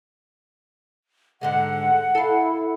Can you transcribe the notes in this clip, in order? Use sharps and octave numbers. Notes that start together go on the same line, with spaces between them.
G#2 D3 G#3 F#5
E4 A4 F5